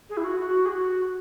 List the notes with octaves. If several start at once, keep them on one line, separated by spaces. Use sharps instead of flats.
G#4
E4
F#4
F#4
G#4
F#4